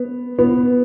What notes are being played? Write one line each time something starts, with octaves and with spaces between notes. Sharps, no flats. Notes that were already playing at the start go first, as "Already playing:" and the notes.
Already playing: B3
B3